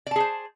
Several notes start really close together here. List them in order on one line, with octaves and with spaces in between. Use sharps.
D5 A5 G#4 C5